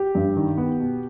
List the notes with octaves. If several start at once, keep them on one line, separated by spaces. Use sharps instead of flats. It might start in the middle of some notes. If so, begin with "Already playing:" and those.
Already playing: G4
G2
D#3
B3
B2